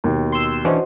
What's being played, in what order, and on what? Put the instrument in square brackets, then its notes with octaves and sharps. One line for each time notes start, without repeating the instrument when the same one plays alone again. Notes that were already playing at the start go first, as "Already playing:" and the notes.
[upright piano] D#2 B2 D#3
[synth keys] C6 E6
[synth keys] E3 C#4 D4 [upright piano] F#4 C5 D#5